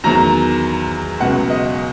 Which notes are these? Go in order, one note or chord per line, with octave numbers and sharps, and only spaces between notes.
E2 D#3 F#3 A#5
C#2 B2 F#3 F#5
D#5